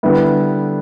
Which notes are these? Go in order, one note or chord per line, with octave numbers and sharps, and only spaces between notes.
D3 G3 B3 E4